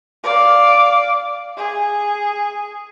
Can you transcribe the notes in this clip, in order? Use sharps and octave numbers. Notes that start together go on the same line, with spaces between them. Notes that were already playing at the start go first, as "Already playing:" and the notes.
D5 F5
G#4